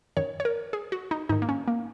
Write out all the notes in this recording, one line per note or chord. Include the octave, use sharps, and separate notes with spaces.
F#2 D#3 C#5
C#5
A#4
G#4
F#4
D#4
G#2 D#3 D#4
A#3
C#4
A#3